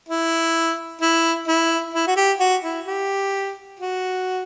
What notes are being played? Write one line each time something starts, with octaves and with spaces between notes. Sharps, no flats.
E4
E4
E4
E4
F#4
G4
F#4
E4
G4
F#4